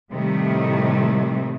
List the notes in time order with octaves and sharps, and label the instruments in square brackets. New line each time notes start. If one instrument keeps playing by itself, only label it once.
[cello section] A2 C3 D#3 F3 G3 A3